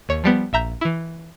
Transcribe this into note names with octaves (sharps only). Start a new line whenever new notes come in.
D#2 C#5
F3 G3 B3
A#1 E5 A#5 G6
E3 E4